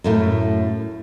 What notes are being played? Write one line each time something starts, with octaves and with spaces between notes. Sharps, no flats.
F#2 A2 A3